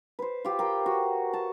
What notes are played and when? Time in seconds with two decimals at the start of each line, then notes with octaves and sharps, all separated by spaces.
0.19 B4 C5
0.45 F4 G4
0.59 A#4 G5
0.86 F#4
1.33 A5